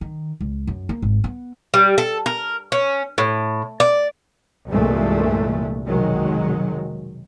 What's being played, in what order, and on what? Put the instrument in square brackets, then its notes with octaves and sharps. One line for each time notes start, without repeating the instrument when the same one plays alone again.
[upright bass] D#3
C#2
F#2
A#3
G#1
B3
[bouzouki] G3
A4
A#4
C#4
A2
D5
[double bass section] C2 G2 A#2 E3 G#3 A3
F1 B1 D#3 F#3 G#3